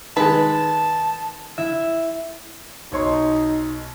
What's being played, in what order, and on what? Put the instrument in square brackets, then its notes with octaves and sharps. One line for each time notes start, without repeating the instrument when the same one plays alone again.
[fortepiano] D#3 G#3 [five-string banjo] B4 [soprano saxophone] A5
[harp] E4 E5
[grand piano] B1 C#5 C6 [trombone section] D#4